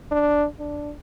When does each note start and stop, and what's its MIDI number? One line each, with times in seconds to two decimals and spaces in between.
0.11 0.46 62
0.59 0.92 62